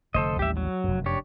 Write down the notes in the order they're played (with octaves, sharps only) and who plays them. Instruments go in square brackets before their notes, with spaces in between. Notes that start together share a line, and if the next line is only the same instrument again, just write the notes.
[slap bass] F1 D3 A3 [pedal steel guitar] A4 C5 D#5
[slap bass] A1 D#2 G3 [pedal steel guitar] G4 E5
[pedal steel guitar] F#3
[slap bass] F1 F#2
[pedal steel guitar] D4 G4 C#5